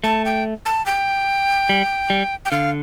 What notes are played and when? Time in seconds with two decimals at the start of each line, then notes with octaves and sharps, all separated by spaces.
0.04 A3 A5
0.25 G5
0.66 A5
0.86 G5
1.69 G3
2.10 G3
2.45 G5
2.51 D3 F5